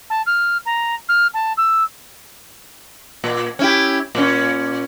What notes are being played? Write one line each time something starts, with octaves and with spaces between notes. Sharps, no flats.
A5
F6
A#5
F6
A5
E6
A#2
C#4 E4 G4
A#2 C#4